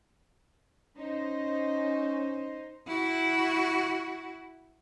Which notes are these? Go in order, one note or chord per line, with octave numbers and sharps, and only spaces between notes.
C#4 D#4 C5 D#5
E4 F#4